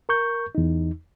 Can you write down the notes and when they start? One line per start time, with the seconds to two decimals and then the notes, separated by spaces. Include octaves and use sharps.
0.09 A#4 C#6 G6
0.55 E2 D#4